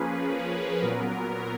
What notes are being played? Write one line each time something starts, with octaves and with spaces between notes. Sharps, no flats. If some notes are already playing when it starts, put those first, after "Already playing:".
Already playing: F3 A#3 C#4 G#4 B4
A#2 F#3 B3 A#4